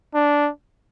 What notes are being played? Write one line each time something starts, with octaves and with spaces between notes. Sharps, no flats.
D4